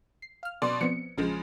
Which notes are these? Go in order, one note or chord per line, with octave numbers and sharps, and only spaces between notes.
C7
F5 F6
B2 D5 C6
F3 B3 C4 C#7
A#1 C#3 F3 G#3